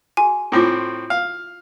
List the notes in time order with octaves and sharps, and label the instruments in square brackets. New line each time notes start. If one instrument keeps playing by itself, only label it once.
[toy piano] F#4 G#4 [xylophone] G#5
[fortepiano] A2 C4 [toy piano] E4 F4 D6
[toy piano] F#4
[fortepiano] F5